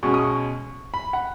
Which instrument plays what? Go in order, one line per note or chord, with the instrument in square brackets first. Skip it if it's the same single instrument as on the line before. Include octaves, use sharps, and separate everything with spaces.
[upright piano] B2 G#3 C#4 [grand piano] C#6
[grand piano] D#6
C#6
B5
F#5